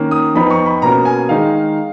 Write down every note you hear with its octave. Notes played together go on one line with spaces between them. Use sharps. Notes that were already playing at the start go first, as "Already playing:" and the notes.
Already playing: D#3 A#3 C#4
D#6
F2 F3 B3 D#4 B5
C#6
B5
B2 A#3 C#4 A#5
G#5
D#3 G#3 D#4 F5